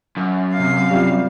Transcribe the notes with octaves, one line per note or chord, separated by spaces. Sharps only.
F#2
C3 F5
G3 C4 F4